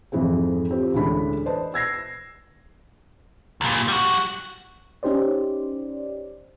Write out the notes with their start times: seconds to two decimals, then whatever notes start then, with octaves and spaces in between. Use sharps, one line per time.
0.12 F2 G#2 E3 G#3 C4
0.71 C4 F4 G4
0.94 A1 D2 E3 G#3 D4 B5
1.46 B4 C5 D5 D#5 A5
1.74 E6 G#6 A#6 C7
3.61 C2 A#2
3.88 G3 F#4
5.03 C#4 D#4 G4 C5 D5